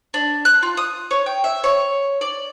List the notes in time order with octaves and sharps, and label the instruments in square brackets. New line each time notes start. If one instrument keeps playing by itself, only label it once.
[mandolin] D4
F#6
F4
D#6
C#5
G5
E5
C#5
D5